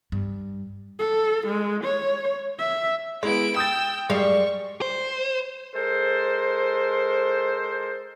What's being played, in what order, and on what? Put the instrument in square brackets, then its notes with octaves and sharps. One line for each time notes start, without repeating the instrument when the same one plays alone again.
[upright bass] G2
[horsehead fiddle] A4
G#3
C#5
E5
[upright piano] G#3 B3 [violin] E4 D7
[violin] G5 E6 [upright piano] D#6 G6 A6
[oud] F#2 G3 F5 [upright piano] G#3 [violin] C#6
[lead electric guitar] C5
[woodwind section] G#3 A4 A#4 C5